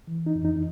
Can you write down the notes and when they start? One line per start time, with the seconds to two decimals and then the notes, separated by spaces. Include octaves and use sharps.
0.07 E3
0.26 D#4
0.35 F2
0.45 D#4